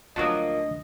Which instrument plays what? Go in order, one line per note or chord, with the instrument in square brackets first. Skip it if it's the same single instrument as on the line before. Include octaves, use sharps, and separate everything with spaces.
[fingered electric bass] D2 D3 [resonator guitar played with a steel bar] F3 A#3 [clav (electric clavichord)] F#3 F#4 A5 [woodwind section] D#5